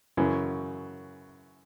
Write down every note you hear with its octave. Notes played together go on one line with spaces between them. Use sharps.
F#2 C#3 E3